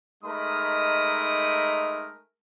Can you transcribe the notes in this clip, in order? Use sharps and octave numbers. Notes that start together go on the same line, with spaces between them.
G#3 A3 D#4 A#4 B5 D#6